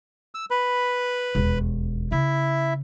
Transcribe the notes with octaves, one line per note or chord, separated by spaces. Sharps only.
E6
B4 B5
E1 D#2
C#3 E4 E5